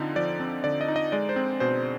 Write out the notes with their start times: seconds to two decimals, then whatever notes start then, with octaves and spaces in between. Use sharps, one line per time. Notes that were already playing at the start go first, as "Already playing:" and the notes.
Already playing: D3 F3 C4 D#4
0.16 F3 D5
0.40 C4
0.64 D3 D5
0.81 D#5
0.88 D#4
0.96 D#5
1.12 G#3 D5
1.29 C5
1.36 C4
1.60 B2 C5